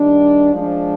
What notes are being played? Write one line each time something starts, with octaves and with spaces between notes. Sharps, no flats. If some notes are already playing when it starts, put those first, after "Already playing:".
Already playing: D#3 G3 D4
F3 G#3 D4